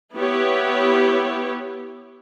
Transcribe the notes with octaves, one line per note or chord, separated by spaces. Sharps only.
B3 E4 G4 C#5